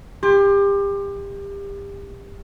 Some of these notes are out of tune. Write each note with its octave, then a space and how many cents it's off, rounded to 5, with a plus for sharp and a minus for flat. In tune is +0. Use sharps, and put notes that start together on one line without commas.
G4 +30 C6 +0